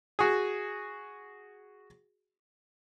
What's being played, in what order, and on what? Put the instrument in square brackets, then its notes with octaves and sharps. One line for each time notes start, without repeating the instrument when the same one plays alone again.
[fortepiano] F#4 G#4